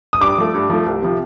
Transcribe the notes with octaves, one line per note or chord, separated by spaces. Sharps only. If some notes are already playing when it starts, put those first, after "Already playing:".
D#6
G2 D6
F3 A3
G2
F3 A3
C2
C3 F3